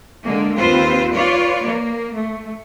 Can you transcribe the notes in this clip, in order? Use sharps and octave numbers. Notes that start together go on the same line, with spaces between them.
D3 G#3 A#3
D#2 C4 F4 B4 C5
F4 B4 C#5 D5
A#3
A3